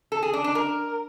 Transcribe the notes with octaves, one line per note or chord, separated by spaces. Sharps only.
A4
G#4
D4
D4
A#4